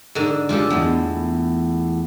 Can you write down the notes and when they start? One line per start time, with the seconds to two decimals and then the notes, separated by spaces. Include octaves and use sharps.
0.15 G#2 D3
0.49 G#3 C#4 F4 G4 A4
0.70 E2 A2 G#3